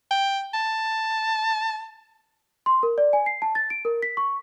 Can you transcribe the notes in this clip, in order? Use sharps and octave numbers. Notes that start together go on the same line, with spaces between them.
G5
A5
C6
A#4
D5
G#5
C7
A5
A6
D7
A#4
B6
C#6